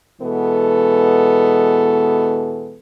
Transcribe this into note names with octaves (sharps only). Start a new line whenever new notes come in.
B2 E3 G#3 B3 A4